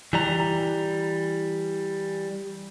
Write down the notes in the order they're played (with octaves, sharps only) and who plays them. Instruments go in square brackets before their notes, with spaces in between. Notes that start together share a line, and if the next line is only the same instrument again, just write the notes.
[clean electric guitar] E3 G3 A#5